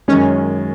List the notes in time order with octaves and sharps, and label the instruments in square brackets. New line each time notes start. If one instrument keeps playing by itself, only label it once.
[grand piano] F#2 D#3 G#3 [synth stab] C#4